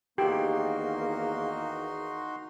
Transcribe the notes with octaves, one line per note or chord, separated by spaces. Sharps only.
E2 D#3 A#3 D#4 F#4 G4 C6